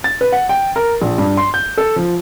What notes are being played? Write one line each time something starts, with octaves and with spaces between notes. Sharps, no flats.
A6
B4
F#5
G5
A#4
A#1
G2
C6
G6
A4
F3